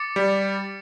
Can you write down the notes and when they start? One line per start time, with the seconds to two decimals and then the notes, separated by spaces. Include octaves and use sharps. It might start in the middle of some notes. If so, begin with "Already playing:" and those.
Already playing: D6 A6 C#7
0.16 G3